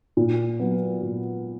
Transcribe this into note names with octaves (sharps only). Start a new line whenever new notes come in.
A#2
F#3 B3
A#2